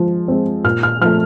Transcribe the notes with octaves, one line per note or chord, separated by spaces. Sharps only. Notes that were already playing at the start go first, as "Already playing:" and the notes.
Already playing: F3 G#3
G#3 C4
A#2 F6
F6
F3 A3 F6